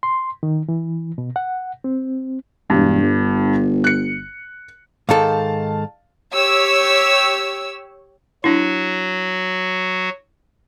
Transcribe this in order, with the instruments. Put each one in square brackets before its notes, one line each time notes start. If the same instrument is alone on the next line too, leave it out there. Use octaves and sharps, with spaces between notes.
[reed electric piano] C6
D#3
E3
B2
F#5
C4
[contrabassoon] E1 [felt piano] G2
[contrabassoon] G1
[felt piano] F#6 C#7
[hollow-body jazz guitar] G#2 D#3 A4 [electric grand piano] F5 A5
[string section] G4 C#5 E6
[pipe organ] F#3 F#4 [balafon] D4 E4